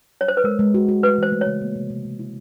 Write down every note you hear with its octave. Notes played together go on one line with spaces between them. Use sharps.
C#5
C5
B4
G#3 A#4
G#3
F#4
F#4
A3 B4
E3 C5
A3
C#5
C#3
A#3
C3
C3
C3
E4